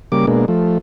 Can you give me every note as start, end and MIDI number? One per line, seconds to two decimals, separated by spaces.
0.12 0.26 49
0.12 0.26 55
0.12 0.26 58
0.12 0.26 86
0.27 0.46 47
0.27 0.46 56
0.27 0.46 58
0.27 0.46 62
0.48 0.78 53
0.48 0.78 57